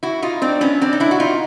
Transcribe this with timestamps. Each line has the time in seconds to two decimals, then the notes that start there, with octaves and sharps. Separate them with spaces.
0.03 E4 F#4
0.22 D#4 F4
0.42 C4 D4
0.61 B3 C#4
0.81 C4 D4
0.93 D#4
1.00 D4 E4
1.11 F#4
1.20 D#4 F4